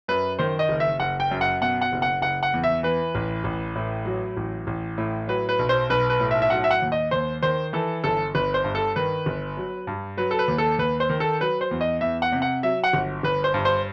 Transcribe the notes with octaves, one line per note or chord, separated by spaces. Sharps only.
F#2 B4
D#3 C5
D#5
F#1
E5
F#1 F#5
G5
F#2
F#5
B2 F#5
F#5
F#1
F#5
F#1 F#5
F#5
E2
E5
E3 B4
A1
A1
A2
F#3
A1
A1
A2
F#3 B4
B4
B1
C5
B1 B4
B4
A2
E5
E5
F#3 F#5
E5
F#5
D#2
D#5
D#2 C5
D#3 C5
E3 A4
G1 A4
G1 B4
C5
G2
A4
D#3 B4
G1
F#3
G2
F#3 B4
A4
B4
D#2
A4
D#2 B4
C5
D#3
A4
F#3 B4
C5
E2
D#5
E2 E5
F#5
C3
F#5
F#3 E5
F#5
G1
G1 B4
C5
G2
C5